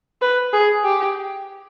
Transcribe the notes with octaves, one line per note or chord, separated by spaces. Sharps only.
B4
G#4
G4